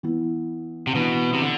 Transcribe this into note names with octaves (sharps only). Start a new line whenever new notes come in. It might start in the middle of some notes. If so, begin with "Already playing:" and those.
E3 B3 E4
C3
B2 E3 B3 D4
C3
D3